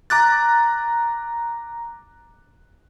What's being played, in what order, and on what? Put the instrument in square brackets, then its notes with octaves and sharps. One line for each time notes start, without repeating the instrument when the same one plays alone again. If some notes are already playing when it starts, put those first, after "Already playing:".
[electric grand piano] A#5 D6 F#6 A6